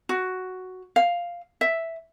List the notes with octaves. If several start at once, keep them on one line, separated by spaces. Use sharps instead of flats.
F#4
F5
E5